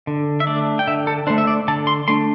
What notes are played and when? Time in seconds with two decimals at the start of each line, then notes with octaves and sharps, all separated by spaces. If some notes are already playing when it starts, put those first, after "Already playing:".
0.07 D3
0.40 E5
0.46 A3 D4 D5
0.79 G5
0.87 D3 E5
1.07 A4
1.27 A3 D4 C5
1.38 E5
1.47 D5
1.68 D3 A5
1.87 C6
2.08 A3 D4 C6